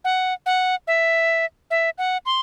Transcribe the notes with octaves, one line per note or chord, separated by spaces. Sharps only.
F#5
F#5
E5
E5
F#5
C6